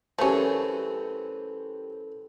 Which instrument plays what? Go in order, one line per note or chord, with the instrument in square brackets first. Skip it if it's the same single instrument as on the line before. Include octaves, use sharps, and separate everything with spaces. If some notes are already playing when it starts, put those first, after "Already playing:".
[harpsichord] F#2 E3 C4 [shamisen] A3 C#4 [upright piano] G4 C5 [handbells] A4